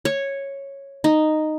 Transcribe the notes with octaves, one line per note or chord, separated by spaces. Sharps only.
C#5
D#4